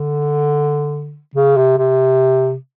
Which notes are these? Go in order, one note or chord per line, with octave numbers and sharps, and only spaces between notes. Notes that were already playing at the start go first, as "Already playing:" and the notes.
Already playing: D3
C#3
C3
C3